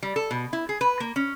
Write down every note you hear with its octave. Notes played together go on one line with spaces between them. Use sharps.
G3
A4
B2
E4
G#4
B4
A#3
C#4